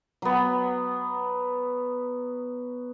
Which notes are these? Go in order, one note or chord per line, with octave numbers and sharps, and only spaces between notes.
F#3 B3